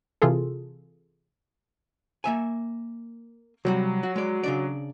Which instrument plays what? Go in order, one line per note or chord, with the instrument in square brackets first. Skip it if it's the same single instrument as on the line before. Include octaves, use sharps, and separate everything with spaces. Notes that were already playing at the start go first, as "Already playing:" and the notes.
[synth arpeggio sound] C3 E3 F4 G#4 A4
[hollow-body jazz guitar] A#3 E5 G#5
[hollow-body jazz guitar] C3 G3 F#4 [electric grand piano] F#3
[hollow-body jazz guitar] F#4
G#3 D5
C#3 D4 D5